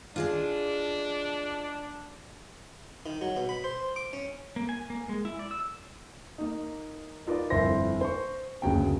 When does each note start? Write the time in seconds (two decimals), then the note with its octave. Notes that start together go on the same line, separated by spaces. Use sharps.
0.16 D4 F4 G#4 D#5
3.06 D#3
3.21 F#3
3.36 B2
3.49 B5
3.64 C5
3.96 D6
4.13 C#4
4.56 A#3
4.69 G#5
4.90 A#3
5.09 G#3
5.25 E4
5.39 D5
5.51 E6
6.38 A#3 D#4
7.27 D#4 F4 A#4 B4 D5
7.50 G1 F2 E4 C5 C6 A#6
8.01 C5 C#6
8.62 F#1 D2 C#3 F#3 B3 G5